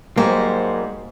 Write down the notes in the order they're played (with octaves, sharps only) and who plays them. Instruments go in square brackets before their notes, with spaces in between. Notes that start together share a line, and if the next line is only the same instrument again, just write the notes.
[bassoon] G#2 [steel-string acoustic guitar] F#3 G3 C5 [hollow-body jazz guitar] A#3